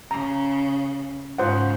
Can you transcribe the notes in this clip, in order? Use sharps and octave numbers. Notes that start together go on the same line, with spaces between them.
C#3 A#5
G#2 C#3 F4 C5 F#5